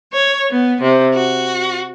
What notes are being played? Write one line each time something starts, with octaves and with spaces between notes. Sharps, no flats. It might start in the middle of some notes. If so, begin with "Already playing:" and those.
C#5
B3
C3
F#4